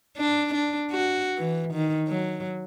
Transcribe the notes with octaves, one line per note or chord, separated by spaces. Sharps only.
D4
D4
F#4
E3
D#3
F#3